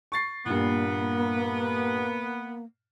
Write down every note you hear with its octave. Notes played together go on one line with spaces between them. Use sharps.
C#6 A6 C7
G2 A#2 A#3 B3